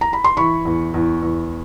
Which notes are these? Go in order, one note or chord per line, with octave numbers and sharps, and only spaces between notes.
A#5
B5
C6
E3 B5 C#6
E2
E2
E2